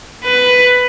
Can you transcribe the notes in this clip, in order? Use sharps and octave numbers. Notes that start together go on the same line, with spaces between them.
B4